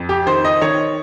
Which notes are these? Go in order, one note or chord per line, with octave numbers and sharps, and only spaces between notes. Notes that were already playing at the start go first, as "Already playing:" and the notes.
Already playing: F2
G4
D#3 C5
D#5
D#3 C#5